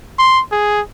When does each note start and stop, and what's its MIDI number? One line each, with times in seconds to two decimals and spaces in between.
0.19 0.42 84
0.52 0.81 68